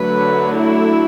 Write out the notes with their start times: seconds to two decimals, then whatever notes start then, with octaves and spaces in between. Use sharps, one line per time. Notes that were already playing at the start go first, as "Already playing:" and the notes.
Already playing: D3 F#3 A3 B4
0.57 E4